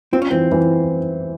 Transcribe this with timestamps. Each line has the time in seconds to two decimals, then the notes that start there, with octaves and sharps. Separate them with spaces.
0.12 C4 F4
0.22 C#4
0.31 E3 C4
0.52 E3